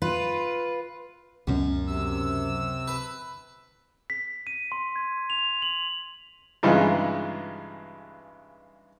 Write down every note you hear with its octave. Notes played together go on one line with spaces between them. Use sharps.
F4 B4
C#2 F#2 B2 C#4
C3 E6
B4
B6
D#7
C6
G#6
F7
F#7
G2 C#3 E3 G#3 D#4 F4